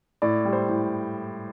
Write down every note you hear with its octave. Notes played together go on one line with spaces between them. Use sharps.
A2 D5
G3
C5
A2